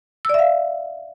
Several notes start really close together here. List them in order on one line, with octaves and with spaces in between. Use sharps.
E6 D5 E5 F5